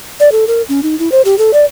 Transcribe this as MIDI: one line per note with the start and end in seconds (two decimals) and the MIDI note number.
0.20 0.31 74
0.32 0.45 69
0.47 0.62 70
0.69 0.83 61
0.83 0.98 63
0.99 1.11 64
1.12 1.21 72
1.25 1.37 67
1.38 1.51 69
1.53 1.65 74